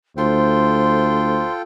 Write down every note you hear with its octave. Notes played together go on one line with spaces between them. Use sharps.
D2 F4 A4 C5 G5 C6